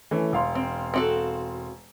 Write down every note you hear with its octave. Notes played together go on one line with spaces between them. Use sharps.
E3 A3 C#4
E1 F5 C6
C4
C4 F#4 A4